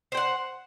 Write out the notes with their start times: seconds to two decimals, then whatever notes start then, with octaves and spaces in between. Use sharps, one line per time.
0.12 C5
0.15 G5
0.17 F#5